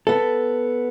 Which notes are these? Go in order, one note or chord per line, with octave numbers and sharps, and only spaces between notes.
B3 A4